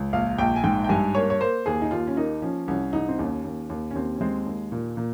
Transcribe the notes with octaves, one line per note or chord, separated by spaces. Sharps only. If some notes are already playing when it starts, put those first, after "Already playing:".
Already playing: C#2
A#1 F5
A#1 G5
G#5
G#2 G5
G5
G2 G#5
A#3 C#5
C#5
A#3 C5
D#2 G#4
D#4
D#2 F4
C#4
A#3 D#4
F3 C#4
C2 C#4
C2 D#4
C4
D#2 C#4
D#2
D#2
C#4
D#2 C4
C#4
G#3 C4
D#2
A#2
A#2